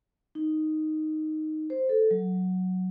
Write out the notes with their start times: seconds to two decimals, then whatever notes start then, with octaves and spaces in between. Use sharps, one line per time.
0.35 D#4
1.70 C5
1.89 A4
2.11 F#3